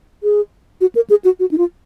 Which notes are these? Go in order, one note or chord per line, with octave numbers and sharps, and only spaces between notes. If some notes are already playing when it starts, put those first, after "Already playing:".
G#4
F#4
A#4
G#4
F#4
F#4
D#4
F4